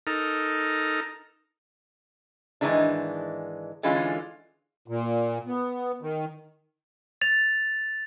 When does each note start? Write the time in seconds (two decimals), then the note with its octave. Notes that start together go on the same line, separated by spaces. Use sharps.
0.07 D#4 A4 A#4
2.61 G#2 D#3 E3 G#3 D4
3.83 D3 E3 G#3 C#4 F4
4.88 A#2
5.47 B3
6.02 D#3
7.21 A6 F7